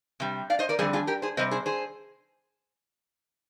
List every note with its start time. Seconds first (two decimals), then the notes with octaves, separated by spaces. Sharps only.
0.20 C3 G3
0.50 D5 F5
0.59 C5 D#5
0.69 A#4 D5
0.79 F2 D3 G3 G#4 C5
0.93 F4 G#4
1.07 G4 A#4
1.22 G#4 C5
1.37 C3 G3 C5 D#5
1.51 G#4 C5
1.66 G#4 C5